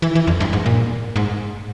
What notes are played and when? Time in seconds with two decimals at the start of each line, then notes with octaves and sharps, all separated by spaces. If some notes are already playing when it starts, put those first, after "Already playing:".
0.02 E3
0.15 E3
0.27 F2
0.40 G2
0.53 G#2
0.66 A#2
1.16 G#2